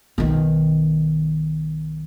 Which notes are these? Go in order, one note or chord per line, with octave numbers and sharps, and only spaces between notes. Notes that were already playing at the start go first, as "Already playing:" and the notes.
B1 D#3